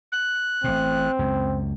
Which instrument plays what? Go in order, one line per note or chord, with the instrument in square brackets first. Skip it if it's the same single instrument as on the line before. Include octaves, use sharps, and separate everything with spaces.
[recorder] F#6
[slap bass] A1 A2 [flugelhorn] C4
[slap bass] C#2 F#2